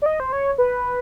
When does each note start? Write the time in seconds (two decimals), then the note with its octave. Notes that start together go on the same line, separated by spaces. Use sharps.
0.02 D5
0.06 D#5
0.20 C5
0.33 C#5
0.58 B4